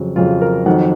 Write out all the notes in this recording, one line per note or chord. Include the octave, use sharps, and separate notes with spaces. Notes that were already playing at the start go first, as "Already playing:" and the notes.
Already playing: F2 C#3 F#3
F2 C#3 F#3 F4
A#4
F2 D#3 F#3 F#5